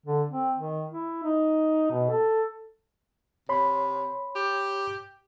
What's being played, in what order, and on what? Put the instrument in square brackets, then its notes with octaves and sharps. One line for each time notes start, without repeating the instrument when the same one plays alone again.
[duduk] D3
C4
D#3
E4
D#4
B2
A4
[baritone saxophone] C3 [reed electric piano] C#5 B5 C6
[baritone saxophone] G4